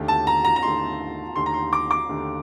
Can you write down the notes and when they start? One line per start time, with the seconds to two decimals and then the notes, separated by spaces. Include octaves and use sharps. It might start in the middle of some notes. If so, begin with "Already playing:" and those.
Already playing: D#2 D3 A3 D#4 G4
0.08 A5
0.27 A#5
0.45 A#5
0.56 A#5
0.63 D#2 D3 A3 D#4 G4 C6
1.36 D#2 D3 A3 D#4 G4 C6
1.46 A#5
1.54 C6
1.73 D6
1.91 D6
2.09 D#2 D3 A3 D#4 G4